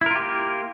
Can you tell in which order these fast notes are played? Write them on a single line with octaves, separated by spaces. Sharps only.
E4 A#4 F4 G4 A#3